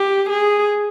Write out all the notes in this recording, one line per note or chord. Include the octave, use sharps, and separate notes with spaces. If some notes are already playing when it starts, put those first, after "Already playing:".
Already playing: G4
G#4